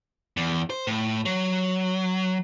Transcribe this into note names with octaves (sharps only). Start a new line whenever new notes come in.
E2
C5
A2
F#3